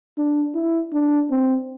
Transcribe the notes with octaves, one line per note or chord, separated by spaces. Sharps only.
D4
E4
D4
C4